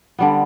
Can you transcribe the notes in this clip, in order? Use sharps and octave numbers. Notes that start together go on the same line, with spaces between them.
D3 G3 B3